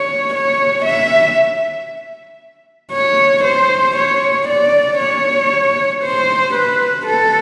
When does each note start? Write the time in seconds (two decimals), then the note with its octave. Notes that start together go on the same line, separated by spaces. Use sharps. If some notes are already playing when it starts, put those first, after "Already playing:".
Already playing: C#5
0.34 C#5
0.86 E5
2.93 C#5
3.44 C5
3.96 C#5
4.48 D5
4.99 C#5
6.03 C5
6.54 B4
7.06 A4